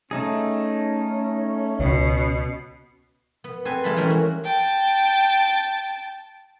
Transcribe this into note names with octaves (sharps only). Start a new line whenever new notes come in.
A3 C#4 D#4 G#4
C#2 B2
B3
C4 G4 A4 B4 G#5
G#3 F4 A4 E5 B5
E3 G3 A3 C#4 A#4
F#4
G5 A5